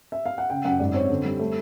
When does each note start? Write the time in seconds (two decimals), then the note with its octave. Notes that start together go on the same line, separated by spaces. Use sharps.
0.12 E5
0.26 F5
0.38 F#5
0.50 C#3 G5
0.65 F#2 F#5
0.79 G#2 D5
0.94 C4 C#5
1.10 D3
1.25 G3
1.39 A3